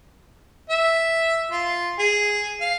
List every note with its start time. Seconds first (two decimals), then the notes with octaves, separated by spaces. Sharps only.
0.70 E5
1.51 F4
1.99 G#4
2.61 F5